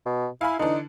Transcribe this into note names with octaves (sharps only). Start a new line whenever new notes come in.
B2
E4 F5 G#5 B5
D3 E3 D4 D#4